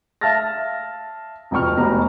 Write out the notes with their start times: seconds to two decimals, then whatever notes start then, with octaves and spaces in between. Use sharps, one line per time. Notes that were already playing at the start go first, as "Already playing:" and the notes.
0.21 E5 F5 A5 F6 A6 A#6
1.51 E1 C2 F2 G5 C#6 F6
1.77 F1 E2 B2 G3 A#5